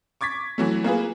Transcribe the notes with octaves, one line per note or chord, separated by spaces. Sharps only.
C#6 D6 G#6 A6 B6
E3 F#3 A3
A#3 F4 G#4 B4